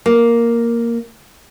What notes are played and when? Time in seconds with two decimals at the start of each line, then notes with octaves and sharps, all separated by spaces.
0.06 A#3